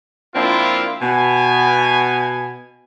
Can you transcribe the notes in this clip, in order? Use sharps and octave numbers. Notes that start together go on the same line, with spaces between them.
F3 A#3 C4 D4 E4 F4
B2 B3 G#5